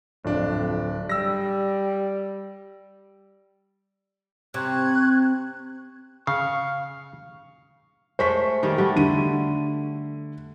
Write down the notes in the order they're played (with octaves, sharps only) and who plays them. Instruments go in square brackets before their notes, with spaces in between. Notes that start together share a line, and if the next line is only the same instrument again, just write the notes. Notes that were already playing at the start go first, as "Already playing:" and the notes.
[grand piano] D1 D4 [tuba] F2
[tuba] G3 [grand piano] E6 A#6
[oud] C3 [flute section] C#6 F#6 G#6
[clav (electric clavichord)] C#3 [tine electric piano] F5 [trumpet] C#6
[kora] G#3 A3 [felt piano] C5 C#6 B6
[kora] D#3 G3 C#5
G3 A3 F#4
[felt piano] D3 D#7